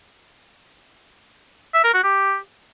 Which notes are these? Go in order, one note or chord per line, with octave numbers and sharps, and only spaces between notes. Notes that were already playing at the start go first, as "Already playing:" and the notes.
E5
A#4
F#4
G4